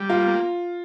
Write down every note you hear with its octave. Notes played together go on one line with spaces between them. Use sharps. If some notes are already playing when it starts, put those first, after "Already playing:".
Already playing: G3
A#3 F4
A#3